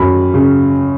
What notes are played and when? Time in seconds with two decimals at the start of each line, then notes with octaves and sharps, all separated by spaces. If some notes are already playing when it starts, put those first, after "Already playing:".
Already playing: F#2 B5
0.34 C#3